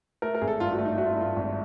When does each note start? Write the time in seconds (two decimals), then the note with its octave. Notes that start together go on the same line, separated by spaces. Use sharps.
0.22 A3 A#4
0.35 A#4
0.41 G#1 G#4
0.48 A4
0.60 G2 F4
0.73 F#4
0.78 A3
0.85 D#4
0.98 A3 F#4
1.05 F4
1.12 E4
1.16 G2 F4
1.36 G#1